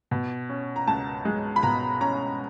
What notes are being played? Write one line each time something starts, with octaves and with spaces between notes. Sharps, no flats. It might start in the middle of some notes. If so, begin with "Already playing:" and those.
B2
C#4
A#5
C#2 A5
G#3
B5
B2 A#5
C#4 A#5